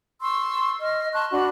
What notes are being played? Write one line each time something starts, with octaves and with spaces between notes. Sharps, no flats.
C6 C#6 E6
D#5 F6
A5 C6 C#6 F#6
D4 F#4 B5